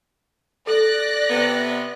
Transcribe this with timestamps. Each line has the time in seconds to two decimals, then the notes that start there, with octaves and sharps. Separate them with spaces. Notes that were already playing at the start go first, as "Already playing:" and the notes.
0.67 A4 D5 F#6 A#6
1.30 C3 B3